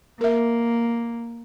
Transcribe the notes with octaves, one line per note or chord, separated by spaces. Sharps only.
A#3 A#4 E5